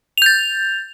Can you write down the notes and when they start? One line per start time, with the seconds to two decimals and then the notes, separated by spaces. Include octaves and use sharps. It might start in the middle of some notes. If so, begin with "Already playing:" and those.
0.18 F7
0.22 G6
0.26 A6